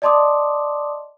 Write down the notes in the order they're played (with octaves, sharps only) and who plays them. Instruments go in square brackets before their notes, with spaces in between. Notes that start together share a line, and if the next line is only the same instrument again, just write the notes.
[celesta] D5 D#5 A5 C6 D6 D#6